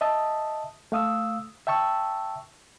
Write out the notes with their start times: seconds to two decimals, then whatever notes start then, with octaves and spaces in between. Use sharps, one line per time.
0.01 D#5 E5 A5 D#6
0.92 A3 F5 D#6 E6
1.67 E5 G5 A5 C#6 E6